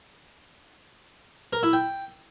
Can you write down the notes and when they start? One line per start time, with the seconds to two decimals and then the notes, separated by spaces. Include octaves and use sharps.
1.53 A#4
1.63 E4
1.73 G5